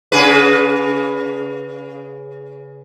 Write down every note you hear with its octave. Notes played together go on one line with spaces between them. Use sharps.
C#3 G#4 B4